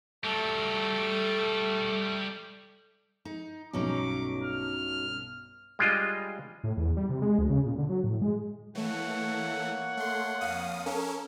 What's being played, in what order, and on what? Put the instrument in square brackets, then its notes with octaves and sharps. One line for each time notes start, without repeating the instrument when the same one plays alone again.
[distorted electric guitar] F#3 G3 [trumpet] A3 [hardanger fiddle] A4
[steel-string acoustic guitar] D#4
[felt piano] B1 G2 [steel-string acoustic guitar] F#3 C#4 D#4 [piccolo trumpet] D6
[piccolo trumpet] F6
[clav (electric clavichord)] G3 G#3 D4 F4 D#5
[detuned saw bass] A2
E2
G3
C3
G#3
D2
C#3
A#2
D3
F#3
A2
G#3
[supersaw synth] E3 A3 [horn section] A#3 C#5 F#5
[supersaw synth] A3 C6
F2 F5 D#6
C#4 A4 A#4